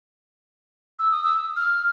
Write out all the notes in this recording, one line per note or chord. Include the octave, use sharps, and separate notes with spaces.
E6
D#6
E6
F6